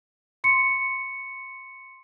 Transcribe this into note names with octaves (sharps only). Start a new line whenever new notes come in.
C6 C#7